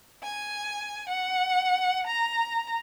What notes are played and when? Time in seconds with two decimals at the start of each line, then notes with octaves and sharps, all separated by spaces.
0.23 G#5
1.08 F#5
2.05 A#5